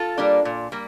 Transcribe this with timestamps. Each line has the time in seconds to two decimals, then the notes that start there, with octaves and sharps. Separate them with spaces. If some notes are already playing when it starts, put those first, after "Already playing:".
Already playing: F4 A4
0.18 G3 A#3 D4
0.45 A#2
0.72 G3 A#3